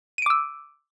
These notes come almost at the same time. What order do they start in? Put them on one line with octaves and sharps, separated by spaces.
D#7 D7 D6 E6